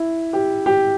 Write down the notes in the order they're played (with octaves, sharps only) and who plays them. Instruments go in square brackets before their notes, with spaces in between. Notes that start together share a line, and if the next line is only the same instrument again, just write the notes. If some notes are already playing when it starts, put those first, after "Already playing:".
Already playing: [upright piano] E4
G4
G4